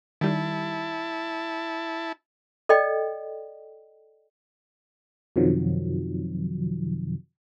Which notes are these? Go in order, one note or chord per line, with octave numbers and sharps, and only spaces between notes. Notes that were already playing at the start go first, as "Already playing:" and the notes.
D#3 G3 E4 A5
A4 D5 D#5 G5
F#2 C3 D#3 F3 F#3